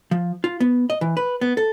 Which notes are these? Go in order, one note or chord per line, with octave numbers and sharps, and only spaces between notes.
F3
F4
B3
D#5
E3
B4
B3
A4